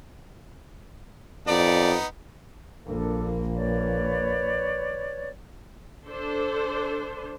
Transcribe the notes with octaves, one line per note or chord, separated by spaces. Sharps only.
F2 B3 D#4 D5
A#1 A#3 D4 A4
B4 C#5 D5
D4 A4 C5